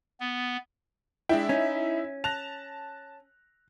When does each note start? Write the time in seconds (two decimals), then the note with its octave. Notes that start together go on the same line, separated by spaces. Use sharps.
0.21 B3
1.29 G#3 D4 E4 G5
1.49 C#4 D#4
2.24 A5 F#6 A#6 F7